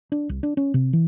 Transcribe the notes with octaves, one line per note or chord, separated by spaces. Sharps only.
D4
C2
D4
C#4
C3
E3